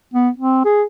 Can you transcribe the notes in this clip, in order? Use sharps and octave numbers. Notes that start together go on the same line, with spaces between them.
B3
C4
G#4